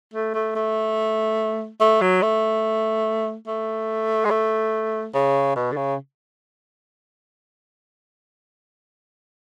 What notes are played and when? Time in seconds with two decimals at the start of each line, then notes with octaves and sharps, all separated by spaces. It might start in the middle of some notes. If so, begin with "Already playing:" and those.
0.14 A3
0.34 A3
0.56 A3
1.80 A3
2.01 F#3
2.22 A3
3.47 A3
4.25 G#3
4.31 A3
5.14 C#3
5.56 B2
5.72 D3
5.76 C#3